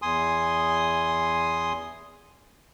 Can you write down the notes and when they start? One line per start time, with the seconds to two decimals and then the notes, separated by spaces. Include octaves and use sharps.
0.02 E2 G#5 C6 D#6